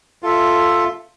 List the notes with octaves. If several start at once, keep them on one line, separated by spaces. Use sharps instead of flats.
F4 A4 E5